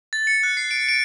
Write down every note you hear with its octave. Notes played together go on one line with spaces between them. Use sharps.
A6
C#7
F#6
C7
D7
D7